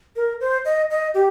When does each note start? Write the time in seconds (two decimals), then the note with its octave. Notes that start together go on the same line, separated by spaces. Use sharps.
0.16 A#4
0.40 C5
0.65 D#5
0.91 D#5
1.14 G4